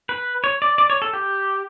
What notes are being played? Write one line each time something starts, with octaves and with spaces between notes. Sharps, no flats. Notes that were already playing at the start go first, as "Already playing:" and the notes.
B4
C#5
D5
D5
C#5
A4
G4